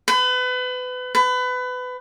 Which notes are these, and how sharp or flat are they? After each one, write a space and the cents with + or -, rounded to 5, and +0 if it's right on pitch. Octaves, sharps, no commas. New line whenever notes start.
B4 +30
B4 +25